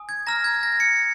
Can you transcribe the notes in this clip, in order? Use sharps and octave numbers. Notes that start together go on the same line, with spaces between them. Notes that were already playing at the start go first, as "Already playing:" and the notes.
Already playing: G#5 D#6
G#6
A#5 F6 A#6
G#6
A#6
C#7